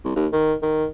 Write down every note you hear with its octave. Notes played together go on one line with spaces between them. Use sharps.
C2
D#2
D#3
D#3